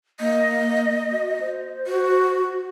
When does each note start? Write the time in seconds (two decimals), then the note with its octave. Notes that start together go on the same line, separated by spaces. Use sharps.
0.20 A#3 D#5
1.12 F#4
1.40 C5
1.87 F#4